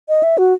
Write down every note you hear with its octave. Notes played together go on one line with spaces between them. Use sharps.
D#5
E5
F#4